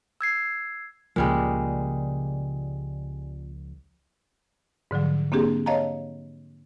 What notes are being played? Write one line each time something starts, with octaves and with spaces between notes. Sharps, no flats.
E6 G#6 C7
C#2 A#2 C#3 F3 G3 G#3
G#2 D3 F3 F#3
A#3 C4 D4 G4 G#4
C#5 D#5 F5 A5 A#5